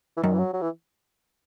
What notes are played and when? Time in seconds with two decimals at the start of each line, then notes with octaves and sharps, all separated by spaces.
0.17 E3
0.23 F#2 D#3
0.34 E3
0.39 F#3
0.53 F#3
0.61 E3